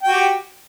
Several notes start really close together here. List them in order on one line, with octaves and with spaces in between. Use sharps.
G5 F#4 G4